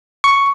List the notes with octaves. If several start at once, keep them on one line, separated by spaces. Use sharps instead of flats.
C#6